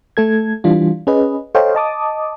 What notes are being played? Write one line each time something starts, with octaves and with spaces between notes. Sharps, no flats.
A3 A4 G#6
E3 G3 D4 F4
C#4 G#4 B4 D#5
A4 C5 C#5 D#5 F5 G5
D#5 A5 D6 D#6